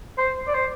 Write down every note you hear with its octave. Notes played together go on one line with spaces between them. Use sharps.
C5
D5
C5